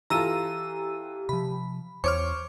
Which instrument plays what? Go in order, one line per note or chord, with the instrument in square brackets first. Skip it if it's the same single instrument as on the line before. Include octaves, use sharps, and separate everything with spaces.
[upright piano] E3 F4 A4 [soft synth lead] G4 [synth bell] A#5 E6 D#7
[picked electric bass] C3 F3 [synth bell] B5
[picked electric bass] E2 [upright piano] C5 C#5 [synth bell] C#6 D6 F6